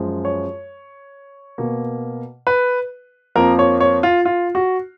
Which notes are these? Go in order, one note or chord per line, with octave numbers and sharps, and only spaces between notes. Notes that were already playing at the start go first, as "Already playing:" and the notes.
Already playing: F#2 F3 G#3
C#5
B2 A#3
B4
F2 F3 A#3 A#4
C#5
C#5
F4
F4
F#4